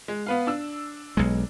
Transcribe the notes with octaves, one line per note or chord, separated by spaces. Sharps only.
G#3
B3 B4 F5
D4 E6
B1 G#3